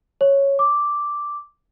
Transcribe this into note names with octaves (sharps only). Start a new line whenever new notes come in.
C#5
D6